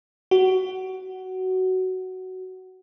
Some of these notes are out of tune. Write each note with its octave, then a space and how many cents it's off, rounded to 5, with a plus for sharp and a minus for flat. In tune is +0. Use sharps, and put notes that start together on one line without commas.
F#4 +15